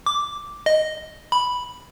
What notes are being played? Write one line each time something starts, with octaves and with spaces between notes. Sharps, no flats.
D6
D#5
B5